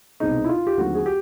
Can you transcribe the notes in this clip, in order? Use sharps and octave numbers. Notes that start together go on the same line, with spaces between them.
C2 B2 G#3 C4 D#4
E4
F4
G4
D#2 D3 F#3 A3 C4 F#4
G#4
G4